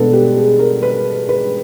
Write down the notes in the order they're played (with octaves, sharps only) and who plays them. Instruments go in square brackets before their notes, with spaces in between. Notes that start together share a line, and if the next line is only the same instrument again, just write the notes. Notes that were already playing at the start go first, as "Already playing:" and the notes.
Already playing: [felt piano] B2 G#3 B3 D4 A4
G4
G#4
A#4
B4
B4